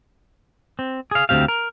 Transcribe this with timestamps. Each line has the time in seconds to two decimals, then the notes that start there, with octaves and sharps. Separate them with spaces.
0.79 C4
1.11 G#4 F5
1.29 D2 D#3 C4 G4 F5
1.48 A#4